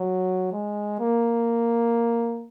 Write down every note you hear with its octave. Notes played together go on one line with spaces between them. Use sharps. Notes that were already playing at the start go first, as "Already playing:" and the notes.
Already playing: F#3
G#3
A#3